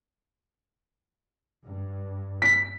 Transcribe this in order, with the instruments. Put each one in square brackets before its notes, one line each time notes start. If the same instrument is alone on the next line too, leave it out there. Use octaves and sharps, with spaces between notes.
[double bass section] G2
[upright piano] B6